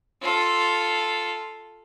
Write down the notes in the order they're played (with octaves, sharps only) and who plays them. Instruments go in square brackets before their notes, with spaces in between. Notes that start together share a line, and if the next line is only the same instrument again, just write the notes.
[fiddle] F4 A4